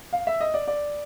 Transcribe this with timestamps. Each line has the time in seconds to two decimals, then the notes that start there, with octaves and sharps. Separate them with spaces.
0.13 F5
0.27 E5
0.41 D#5
0.54 D5
0.68 D5